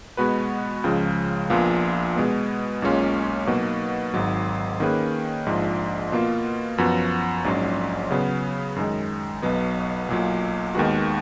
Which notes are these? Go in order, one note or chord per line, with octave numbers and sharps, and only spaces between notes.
B2 G#3 B3 F#4 B4
C#2 C#3 F3 G#3
A#1 A#2 F3 B3 F4
B2 G#3 B3
B1 A#2 G#3 C#4 F4
B2 F#3 A#3 D#4 F#4
G#1 G#2 F#3
D#3 A#3 C#4 G#4 B4
A#1 G#2 F3
B2 A#3 F4
F#2 F3 B3 F#4
A#1 G#2 F#3 C#4
C#3 F#3 B3
F#2 D#3 G#3
B1 B2 F#3 B3
B1 A#2 F#3
D#2 D#3 G#3 B3 F#4